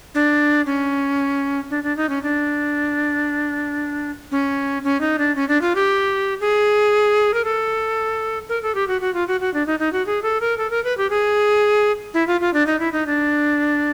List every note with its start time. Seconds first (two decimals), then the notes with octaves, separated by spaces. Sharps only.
0.15 D4
0.66 C#4
1.70 D4
1.83 D4
1.97 D#4
2.09 C#4
2.23 D4
4.31 C#4
4.84 C#4
5.01 D#4
5.19 D4
5.36 C#4
5.49 D4
5.62 F4
5.75 G4
6.40 G#4
7.34 A#4
7.45 A4
8.49 A#4
8.63 A4
8.75 G4
8.88 F#4
9.01 F#4
9.14 F4
9.28 F#4
9.41 F#4
9.54 D4
9.67 D#4
9.79 D#4
9.93 F#4
10.06 G#4
10.23 A4
10.41 A#4
10.58 A4
10.70 A#4
10.84 B4
10.98 G4
11.10 G#4
12.14 E4
12.27 F4
12.41 F4
12.54 D4
12.67 D#4
12.80 E4
12.92 D#4
13.07 D4